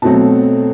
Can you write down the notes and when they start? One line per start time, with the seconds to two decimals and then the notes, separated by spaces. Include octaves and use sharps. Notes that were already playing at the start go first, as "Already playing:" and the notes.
0.02 B2 F#3 A3 C4 A5